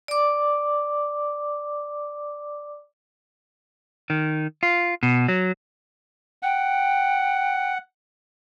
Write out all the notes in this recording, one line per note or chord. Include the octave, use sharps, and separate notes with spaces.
D5 D6
D#3
F4
B2
F#3
F#5 G5